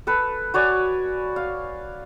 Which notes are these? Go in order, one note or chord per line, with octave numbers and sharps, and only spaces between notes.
A4 B4
F#4 C#5 D5 G#5
F5